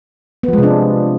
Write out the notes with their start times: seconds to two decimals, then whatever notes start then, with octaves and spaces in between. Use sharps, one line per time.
0.43 B3
0.48 F3
0.53 G#3
0.58 C3
0.63 D4